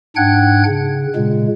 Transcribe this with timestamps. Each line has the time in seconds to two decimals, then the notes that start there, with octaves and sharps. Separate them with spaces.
0.16 G#2 D4 F#5 G5 F#6 G#6
0.67 C#3
1.16 A#2 C#3 G#3